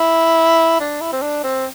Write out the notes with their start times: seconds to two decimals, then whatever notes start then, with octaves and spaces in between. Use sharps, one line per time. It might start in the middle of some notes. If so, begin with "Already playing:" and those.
Already playing: E4
0.80 D4
1.01 E4
1.13 C4
1.22 D4
1.44 C4